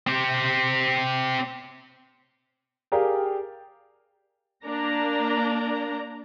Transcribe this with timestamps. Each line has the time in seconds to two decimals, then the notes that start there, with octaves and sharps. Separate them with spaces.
0.07 C4 G4
2.92 G4 G#4 A#4 D5 F5 G5
4.64 A#3 D4 A#5